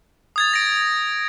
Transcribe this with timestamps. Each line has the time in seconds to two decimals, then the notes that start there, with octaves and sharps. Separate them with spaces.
0.36 D#6 G#6 A6
0.53 A#6 D7